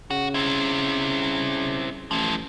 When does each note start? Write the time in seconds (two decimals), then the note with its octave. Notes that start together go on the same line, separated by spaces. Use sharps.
0.11 C#3 F#4
0.34 C4 E4
2.11 A1 F3 E4